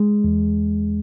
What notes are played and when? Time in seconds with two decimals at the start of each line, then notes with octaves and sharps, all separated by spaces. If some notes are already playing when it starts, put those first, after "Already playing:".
Already playing: G#3
0.24 E2